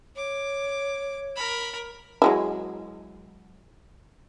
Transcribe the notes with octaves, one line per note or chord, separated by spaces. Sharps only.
C#5 D6
A#4 B5
F#3 G#3 E4